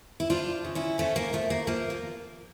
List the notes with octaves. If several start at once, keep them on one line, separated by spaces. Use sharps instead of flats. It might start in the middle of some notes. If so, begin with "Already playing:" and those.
E4
F3 D4 F4
C#3
C#4 E4
F3 A3 C#4
A#3
F3 A3
A#3
F3 A#3
A#3